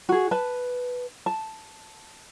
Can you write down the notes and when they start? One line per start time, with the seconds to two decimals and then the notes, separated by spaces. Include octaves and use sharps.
0.09 F#4 G#4
0.31 B4 A5
1.26 A5